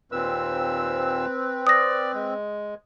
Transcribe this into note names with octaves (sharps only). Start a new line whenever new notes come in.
D#2 A#2 C4 B4 E6
D5 D#6 A#6
G#3